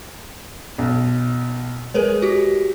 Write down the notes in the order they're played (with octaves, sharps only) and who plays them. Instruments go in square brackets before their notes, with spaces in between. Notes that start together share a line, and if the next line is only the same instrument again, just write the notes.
[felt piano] B1
[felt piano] G#3 G#4 [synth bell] A#4 B4 C#5
[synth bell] F#4 G4